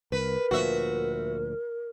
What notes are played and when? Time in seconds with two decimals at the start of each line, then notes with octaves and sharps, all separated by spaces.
0.12 C2 A#4 B4
0.51 D2 A#2 F3 F#4 E5